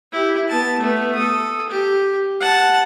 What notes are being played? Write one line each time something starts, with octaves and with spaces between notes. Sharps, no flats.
E4 G4
B3 A5
A3 B3
A4 D#6
G4
F#5 A5